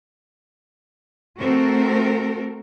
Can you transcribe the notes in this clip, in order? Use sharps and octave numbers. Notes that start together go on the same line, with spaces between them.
A3 C4 F#4 A4 A#4